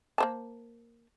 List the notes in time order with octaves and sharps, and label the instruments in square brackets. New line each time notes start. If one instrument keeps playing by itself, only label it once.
[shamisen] A#3 C5 A5